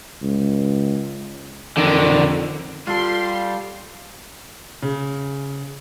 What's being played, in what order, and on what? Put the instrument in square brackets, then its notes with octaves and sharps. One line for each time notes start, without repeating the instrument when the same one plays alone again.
[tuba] C#2
[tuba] F2 [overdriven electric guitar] D3 D#3
[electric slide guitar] G3 [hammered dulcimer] F4 A4 [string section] C6
[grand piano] C#3